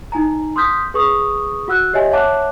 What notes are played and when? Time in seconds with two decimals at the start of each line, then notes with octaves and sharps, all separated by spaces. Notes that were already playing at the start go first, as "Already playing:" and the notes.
0.12 D#4 E4 G#5 A#5
0.56 C6 D#6 F6 G6 B6
0.94 G#4 B4 C#6 D#6
1.68 F#4 F#5 E6 F#6
1.93 G4 C#5 D#5 E5 G#5
2.11 C#5 E5 F#5 A5 D6 F#6